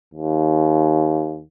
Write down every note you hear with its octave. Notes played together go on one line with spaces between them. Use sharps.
D#2